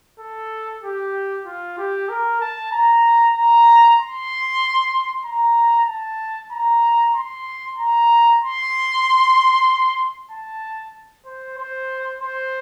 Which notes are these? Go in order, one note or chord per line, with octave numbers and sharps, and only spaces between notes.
A4
G4
F4
G4
A#4
A5
A#5
A#5
C6
A#5
A5
A#5
C6
A#5
C6
A5
C5
C5
C5